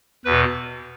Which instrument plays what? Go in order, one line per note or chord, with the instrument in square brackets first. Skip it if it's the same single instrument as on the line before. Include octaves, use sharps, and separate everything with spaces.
[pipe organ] E2 B2 B4